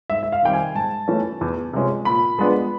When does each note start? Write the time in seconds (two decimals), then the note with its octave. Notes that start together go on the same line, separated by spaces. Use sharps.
0.10 G#2 E5
0.23 E5
0.32 F5
0.43 D#3 G3 C4 G5
0.53 G#5
0.75 G#2 A5
1.08 E3 A3 C#4
1.41 E2
1.73 C3 F3 G#3 C#4
2.05 A#2 B5
2.38 F3 G#3 B3 D4